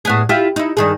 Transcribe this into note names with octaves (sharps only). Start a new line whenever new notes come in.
A2 B3 G#4
E4 F4 G4
D#4 E4
G2 D#3 G#4